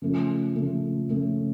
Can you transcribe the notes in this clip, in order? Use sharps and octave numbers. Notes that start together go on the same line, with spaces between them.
C#3 F3 A3 C#4
C#3 F3 A3 C#4
C#3 F3 A3 C#4